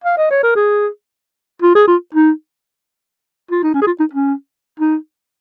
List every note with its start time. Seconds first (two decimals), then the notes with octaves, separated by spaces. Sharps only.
0.04 F5
0.17 D#5
0.31 C#5
0.43 A#4
0.56 G#4
1.62 F4
1.75 G#4
1.87 F4
2.14 D#4
3.51 F4
3.63 D#4
3.74 C#4
3.82 G#4
3.87 F4
4.00 D#4
4.13 C#4
4.80 D#4